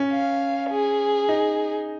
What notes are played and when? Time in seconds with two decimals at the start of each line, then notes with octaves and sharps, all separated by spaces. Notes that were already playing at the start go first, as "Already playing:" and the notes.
Already playing: C#4
0.12 F5
0.70 G#4
1.29 D#4